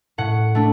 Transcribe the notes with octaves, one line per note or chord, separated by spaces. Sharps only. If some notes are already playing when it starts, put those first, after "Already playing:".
A2 F#5
A3 D4